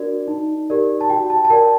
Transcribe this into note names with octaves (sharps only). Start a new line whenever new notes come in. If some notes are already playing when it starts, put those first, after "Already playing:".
Already playing: D4 F#4 A#4 D5
D#4
G4 A#4 D5
A5
F#4 G5
A5
A5
A#4 D5 G5